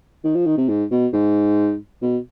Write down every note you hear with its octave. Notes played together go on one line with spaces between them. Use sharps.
D#3
F3
D#3
C3
G#2
B2
G#2
B2